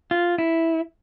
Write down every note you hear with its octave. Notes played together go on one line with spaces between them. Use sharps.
F4
E4